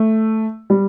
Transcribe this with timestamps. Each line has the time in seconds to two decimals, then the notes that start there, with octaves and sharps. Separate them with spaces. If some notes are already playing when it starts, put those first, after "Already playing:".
Already playing: A3
0.70 G3